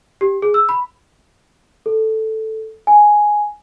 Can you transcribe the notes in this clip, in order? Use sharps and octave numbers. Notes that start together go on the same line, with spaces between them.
G4
G#4
E6
B5
A4
G#5